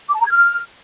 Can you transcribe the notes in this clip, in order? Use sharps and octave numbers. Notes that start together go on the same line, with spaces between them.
D6
A5
A#5
G#6
F6